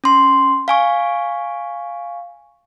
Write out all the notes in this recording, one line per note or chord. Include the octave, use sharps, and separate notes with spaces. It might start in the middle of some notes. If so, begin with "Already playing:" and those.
C#4 C6
F5 G#5 C#6